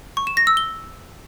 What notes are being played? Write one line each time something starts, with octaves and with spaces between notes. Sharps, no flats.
C#6
E7
A#6
E6
G7